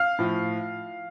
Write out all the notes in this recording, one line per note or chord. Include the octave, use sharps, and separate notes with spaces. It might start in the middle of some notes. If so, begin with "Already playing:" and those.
Already playing: F5 F6
A2 F3